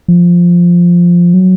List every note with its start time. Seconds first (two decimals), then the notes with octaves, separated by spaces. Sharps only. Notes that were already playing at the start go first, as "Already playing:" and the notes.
0.08 F3
1.34 F#3